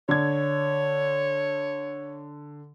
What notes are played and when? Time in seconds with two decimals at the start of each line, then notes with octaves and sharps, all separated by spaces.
0.09 D3 C#5 G#6